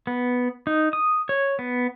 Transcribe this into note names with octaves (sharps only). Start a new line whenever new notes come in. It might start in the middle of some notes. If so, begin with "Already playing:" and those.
B3
D#4
D#6
C#5
B3